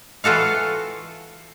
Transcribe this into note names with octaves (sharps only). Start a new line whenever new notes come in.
E3 F4 F#4 A4 F5